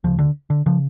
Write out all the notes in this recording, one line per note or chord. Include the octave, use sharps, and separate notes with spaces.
D2 C#3 F3
D3
D3
C#3 F3